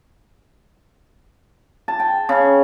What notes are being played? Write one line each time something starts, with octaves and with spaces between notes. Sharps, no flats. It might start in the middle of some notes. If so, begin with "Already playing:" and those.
A5
G5
C#3